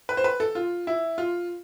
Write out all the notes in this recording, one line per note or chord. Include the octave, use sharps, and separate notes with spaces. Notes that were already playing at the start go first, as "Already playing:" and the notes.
B4
C5
B4
A4
F4
E4
F4